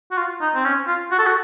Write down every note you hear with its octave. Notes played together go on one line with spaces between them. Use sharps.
F#4
F4
D#4
C4
C#4
F4
F#4
A4
F#4